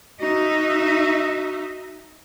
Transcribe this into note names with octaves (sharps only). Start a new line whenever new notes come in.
D#4 F#4 E5